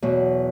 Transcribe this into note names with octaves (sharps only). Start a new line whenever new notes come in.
E2 B2 F#3